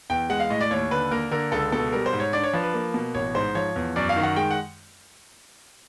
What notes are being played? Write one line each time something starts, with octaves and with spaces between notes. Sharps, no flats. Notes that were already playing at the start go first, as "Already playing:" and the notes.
E2 G5
G#3 F#5
F5
A2 D#5
D5
D#2 C#5
D3 B4
A#3 A#4
D3 A#4
C#2 A4
B2 A4
G3 A#4
C5
G#2
C#5
D4 D5
C#5
F3 B4
B4
A#3
B2
A1 C#5
G#2 C5
F3 C#5
E2
F#2 D5
F5
D#3
F#5
G#3 G5
F#5